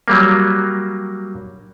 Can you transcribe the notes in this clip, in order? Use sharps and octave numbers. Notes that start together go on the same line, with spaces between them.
F#3 G3 A#3